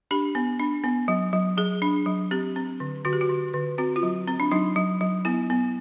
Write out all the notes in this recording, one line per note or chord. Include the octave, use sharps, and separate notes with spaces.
D4 G4
B3
D4
B3
F#3
F#3
F#3 G#4
D4
F#3
C4 G4
C4
D3
D3 F#4
G4
F#4
D3
D3
C4 F#4
F4
F#3
C4
D4
F#3 D#4
F#3
F#3
B3 E4
B3